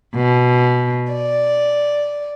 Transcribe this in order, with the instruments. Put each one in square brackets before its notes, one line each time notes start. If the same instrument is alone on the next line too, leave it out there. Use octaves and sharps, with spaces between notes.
[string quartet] B2
D5